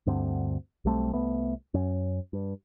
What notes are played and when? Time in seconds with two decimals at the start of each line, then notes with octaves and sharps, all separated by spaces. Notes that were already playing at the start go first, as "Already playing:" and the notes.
0.06 D2 G2 D3 C4
0.85 B1 G3 A3 C4
1.13 C2 A3 B3
1.74 F#2 C#4
2.33 G2